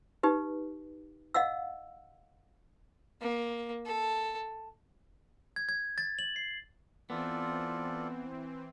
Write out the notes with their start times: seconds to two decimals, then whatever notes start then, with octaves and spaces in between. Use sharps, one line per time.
0.23 D#4 G4 B4
1.34 D#5 F5 F#5 E6
3.21 A#3
3.86 A4
5.56 G#6
5.69 G#6
5.98 A6
6.19 F#7
6.36 C7
7.10 E3 B3 C4 F4 A4 D5